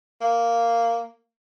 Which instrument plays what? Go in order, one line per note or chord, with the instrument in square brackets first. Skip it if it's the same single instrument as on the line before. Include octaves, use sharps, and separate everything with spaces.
[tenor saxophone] A#3